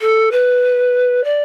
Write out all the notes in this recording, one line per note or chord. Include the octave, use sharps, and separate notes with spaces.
A4
B4
D5